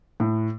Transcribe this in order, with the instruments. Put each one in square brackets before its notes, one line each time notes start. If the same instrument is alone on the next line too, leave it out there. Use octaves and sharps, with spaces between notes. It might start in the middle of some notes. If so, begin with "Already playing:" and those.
[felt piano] A2